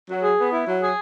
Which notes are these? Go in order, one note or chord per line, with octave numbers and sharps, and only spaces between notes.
F#3
G#4
B3
E4
F#3
G#4